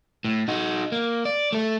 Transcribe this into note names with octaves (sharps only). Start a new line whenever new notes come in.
A2
D#4 F#4
A#3
D5
A3 A4